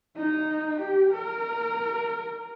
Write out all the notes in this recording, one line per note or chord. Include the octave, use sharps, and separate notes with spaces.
D#4
G4
A#4